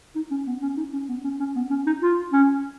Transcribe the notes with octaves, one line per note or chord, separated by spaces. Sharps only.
D#4
C#4
B3
C#4
D#4
C#4
B3
C#4
C#4
B3
C#4
D#4
F4
C#4